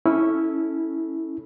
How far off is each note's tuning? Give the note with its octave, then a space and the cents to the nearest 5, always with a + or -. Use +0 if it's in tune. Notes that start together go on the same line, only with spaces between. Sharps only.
C#4 +0 E4 -15 A4 +0